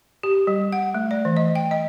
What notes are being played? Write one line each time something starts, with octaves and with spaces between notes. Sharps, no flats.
G4
G3
F#5
A3
D5
E3
D#5
G5
D#5